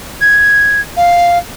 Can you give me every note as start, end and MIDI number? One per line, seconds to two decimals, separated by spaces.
0.21 0.80 92
0.96 1.38 77